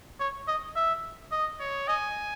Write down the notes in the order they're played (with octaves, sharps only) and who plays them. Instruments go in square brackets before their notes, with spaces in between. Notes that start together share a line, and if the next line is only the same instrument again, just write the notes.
[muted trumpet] C#5
D#5
E5
D#5
[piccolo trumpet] C#5
[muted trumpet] D#5 [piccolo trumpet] G#5